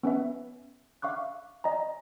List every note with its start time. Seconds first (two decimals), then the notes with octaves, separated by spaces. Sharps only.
0.03 B3 C#4 B4 E5
1.02 E5 F5 C#6 D6 F#6
1.64 D5 D#5 G#5 A#5